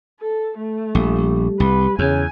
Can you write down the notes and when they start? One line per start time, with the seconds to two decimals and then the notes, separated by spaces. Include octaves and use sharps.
0.20 A4
0.58 A3
0.95 A#1 G3
1.60 C2 B4
1.99 E2 C#3 G#5